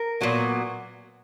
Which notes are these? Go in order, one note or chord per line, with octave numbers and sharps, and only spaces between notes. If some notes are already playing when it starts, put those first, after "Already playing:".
Already playing: A#4
A#2 F#3 B3